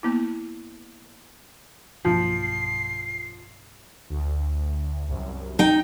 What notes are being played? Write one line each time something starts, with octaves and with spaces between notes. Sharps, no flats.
A#3 B3 E4
B1 G2 F3 A#3 C7
D2
C2 F#2
D#4 G5